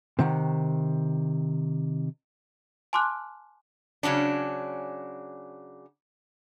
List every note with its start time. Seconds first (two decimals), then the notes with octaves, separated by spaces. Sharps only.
0.19 C3 D#3 F#5
2.93 G#5 A5 C6 D6 F6 F#6
4.03 C#3 F#3 C#4 D4